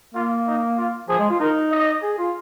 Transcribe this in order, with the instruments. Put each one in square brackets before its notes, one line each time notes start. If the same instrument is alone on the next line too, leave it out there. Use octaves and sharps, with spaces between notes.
[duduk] A#3 [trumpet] F4
[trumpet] D#4
F4
[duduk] F3 [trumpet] G#4
[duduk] G#3
F4
[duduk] D#4 [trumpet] A#4
[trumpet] D#5
[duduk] G#4
F4